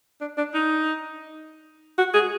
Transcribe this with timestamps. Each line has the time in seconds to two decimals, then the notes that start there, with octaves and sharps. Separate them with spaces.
0.21 D4
0.38 D4
0.54 D#4
1.98 F#4
2.14 G#4